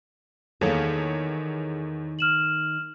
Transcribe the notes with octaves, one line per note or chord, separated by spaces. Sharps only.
E2 D#3 A#3 G#4 A4 C#5
F6 E7 F#7